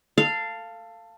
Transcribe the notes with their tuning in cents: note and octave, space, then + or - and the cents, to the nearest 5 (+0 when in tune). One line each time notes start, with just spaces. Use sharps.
A4 +15 F5 -10